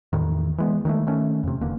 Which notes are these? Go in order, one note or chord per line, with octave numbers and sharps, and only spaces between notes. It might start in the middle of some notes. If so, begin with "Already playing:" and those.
E2 A2 D#3
E3 G#3 B3
D#3 F#3 G#3 A3
D#3 A3 C#4
F2 C3
D#1 E2 D3 A#3